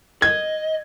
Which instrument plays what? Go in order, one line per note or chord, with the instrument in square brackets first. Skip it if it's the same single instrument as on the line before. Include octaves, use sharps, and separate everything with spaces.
[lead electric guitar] D#5 [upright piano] G#6